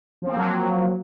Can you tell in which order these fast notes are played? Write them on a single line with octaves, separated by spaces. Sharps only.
F3 C4 A#3 F#3